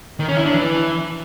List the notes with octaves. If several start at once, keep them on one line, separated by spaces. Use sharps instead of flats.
D#3
C#4
E4
D4
E3